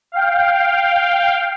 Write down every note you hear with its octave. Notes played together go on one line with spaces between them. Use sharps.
F5 G5